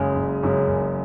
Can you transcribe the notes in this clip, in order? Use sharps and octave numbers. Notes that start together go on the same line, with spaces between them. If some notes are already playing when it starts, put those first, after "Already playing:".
Already playing: F#1 F#2 C#3 G#3 C#4
F#1
F#2 C#3 G#3 C#4
F#1